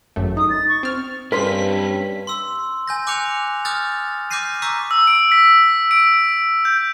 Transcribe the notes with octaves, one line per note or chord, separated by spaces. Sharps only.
G#1 F#2 A3
D#4 D#6
A6
C#6
C4 F6
G2 C4 C#4 A#4 B4 C6 B6
C6 E6
G#5 G6 A#6
G#5 D6 F#6 G6 C#7 F7
D6 D#6 F6 G6 A6
D6 F6 G6 A#6 C7 D#7
A#5 C#6 D6 E6 G6 B6
E6
D7
B6
D7
G6